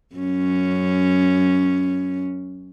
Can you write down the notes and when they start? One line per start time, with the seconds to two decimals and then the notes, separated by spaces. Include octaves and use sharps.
0.16 F#2 C#4